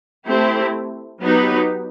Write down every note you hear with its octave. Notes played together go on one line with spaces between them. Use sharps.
A3 C4 E4 G4
F#3 B3 D#4 G4 B4